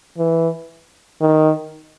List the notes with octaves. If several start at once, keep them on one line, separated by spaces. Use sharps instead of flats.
E3
D#3